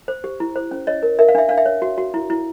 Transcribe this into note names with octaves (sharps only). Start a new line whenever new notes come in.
C5
G4
E4
C5
C#4
C#5 D#5
A#4
A#4 E5
F5
D4 E5
D4 F5
E5
C#5
F#4
F#4
E4
E4